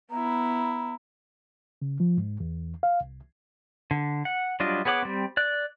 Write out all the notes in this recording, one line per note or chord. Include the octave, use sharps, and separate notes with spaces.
B3 E4 A#5
C#3
F3
G#2
E2
F5
C2
D3
F#5
F#3 G3 D4 F4 D#5
B3 G#4 C#5 F#5 D6
G3 C4
D5 F#6